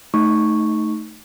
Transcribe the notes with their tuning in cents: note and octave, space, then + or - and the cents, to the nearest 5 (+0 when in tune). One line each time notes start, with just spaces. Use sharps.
A3 +0 D#4 +0 C#6 +0